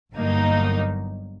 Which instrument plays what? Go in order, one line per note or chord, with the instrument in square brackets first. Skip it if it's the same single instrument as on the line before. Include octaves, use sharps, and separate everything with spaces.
[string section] G1 G2 F#3 A#3 D#4